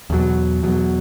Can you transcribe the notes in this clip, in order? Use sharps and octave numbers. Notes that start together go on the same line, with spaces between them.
E2 B2 F#3
E2 B2 F#3